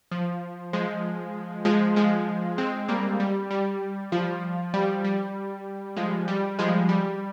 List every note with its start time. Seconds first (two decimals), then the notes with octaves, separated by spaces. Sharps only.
0.12 F3
0.73 F3 G#3
1.65 F3 G#3
1.96 F3 G#3
2.58 G#3 C4
2.88 G3 A#3
3.20 G3
3.51 G3
4.12 F3
4.74 G3
5.05 G3
5.97 F3 G#3
6.28 G3
6.59 F3 G#3
6.89 G3